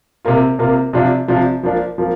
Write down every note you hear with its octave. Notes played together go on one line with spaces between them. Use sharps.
C3 A#3 F4
C3 A#3 F4
C3 F3 D4 F4
C3 F3 D4 F4
F3 A#3 D4 F4
F3 A#3